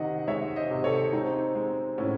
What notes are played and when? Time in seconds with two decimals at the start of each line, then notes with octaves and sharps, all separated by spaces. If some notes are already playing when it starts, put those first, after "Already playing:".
Already playing: C3 D#3 D#5 F#5
0.28 G#3 C#5 E5
0.56 C5 D#5
0.71 C3
0.84 A4 C#5
1.13 G#3 C4 D#4
1.55 G#3
1.98 A2 C#4 E4